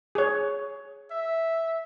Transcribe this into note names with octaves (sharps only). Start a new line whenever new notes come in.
G#4 C#5
E5